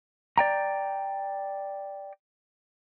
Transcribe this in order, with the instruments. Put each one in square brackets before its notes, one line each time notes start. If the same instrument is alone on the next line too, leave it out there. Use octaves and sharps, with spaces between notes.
[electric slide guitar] D5 G5 A#5